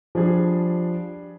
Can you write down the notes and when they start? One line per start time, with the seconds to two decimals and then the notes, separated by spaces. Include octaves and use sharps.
0.15 F3 G3 D4 G#4